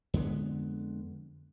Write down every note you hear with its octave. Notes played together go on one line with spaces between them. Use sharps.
F2 D3 G#3 B3